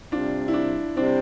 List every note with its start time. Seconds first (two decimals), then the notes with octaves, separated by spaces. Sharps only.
0.12 C3 G3 C4 D4 F4
0.48 E4
0.54 D4
0.96 C3 G3 C4 D4